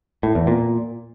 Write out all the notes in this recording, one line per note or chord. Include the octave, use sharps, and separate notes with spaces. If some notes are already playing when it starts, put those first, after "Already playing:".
A2
E2
A#2